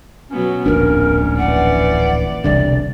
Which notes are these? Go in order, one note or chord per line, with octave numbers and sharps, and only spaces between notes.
B2 F#3 B3 C#4
D1 A#1 F2 G#2 D4 A#4
E3 D5 F#5
E1 C2 D3 D5